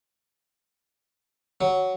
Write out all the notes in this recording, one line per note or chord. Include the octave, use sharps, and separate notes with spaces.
F#3